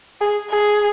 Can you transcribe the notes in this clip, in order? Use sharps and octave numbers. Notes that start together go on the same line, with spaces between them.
G#4
G#4